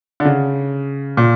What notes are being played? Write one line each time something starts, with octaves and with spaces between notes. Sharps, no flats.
D3
C#3
A#2